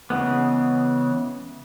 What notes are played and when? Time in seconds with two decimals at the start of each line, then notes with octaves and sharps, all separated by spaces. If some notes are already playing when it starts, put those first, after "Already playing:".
0.10 C#3 E3 G#3 B3